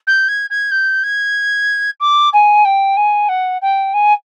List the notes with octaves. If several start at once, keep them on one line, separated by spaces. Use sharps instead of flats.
G6
G#6
G#6
G6
G#6
D6
G#5
G5
G#5
F#5
G5
G#5